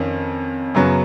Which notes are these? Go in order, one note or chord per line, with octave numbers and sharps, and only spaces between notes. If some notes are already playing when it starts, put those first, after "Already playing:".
Already playing: F2 D#3 C#4
F#2 C#3 F#3 B3